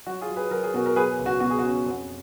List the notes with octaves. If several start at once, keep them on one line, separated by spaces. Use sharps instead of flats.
F#3 F#4
F4 G#4
F#3
G#4 B4
F#3 A#4
G#4
B2 F#4 A#4
A#4
F#3 G#4 B4
C#2
F#4
B2 F#4
G#4
C#4 F#4
F2